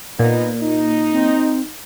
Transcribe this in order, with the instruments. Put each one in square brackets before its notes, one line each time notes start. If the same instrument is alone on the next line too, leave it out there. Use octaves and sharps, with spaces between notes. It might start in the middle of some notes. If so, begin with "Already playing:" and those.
[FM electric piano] A#2 [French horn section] B3 D#4
[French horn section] D#4
[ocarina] C4